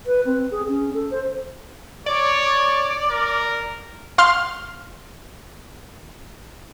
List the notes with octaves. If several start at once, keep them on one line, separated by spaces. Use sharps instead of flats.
B4
C4
G#4
C#4
A4
C5
C#5 D5
A#4
F5 C6 F6